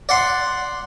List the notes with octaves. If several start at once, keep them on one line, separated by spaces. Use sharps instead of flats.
D5 F#5 C6